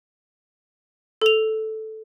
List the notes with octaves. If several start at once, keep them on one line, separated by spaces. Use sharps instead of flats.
A4 F7